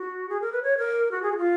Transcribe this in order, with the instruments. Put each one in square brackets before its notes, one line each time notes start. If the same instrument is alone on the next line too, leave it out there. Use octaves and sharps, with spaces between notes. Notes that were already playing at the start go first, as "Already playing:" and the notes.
Already playing: [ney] F#4
G#4
A#4
B4
C#5
A#4
F#4
G#4
F#4
F4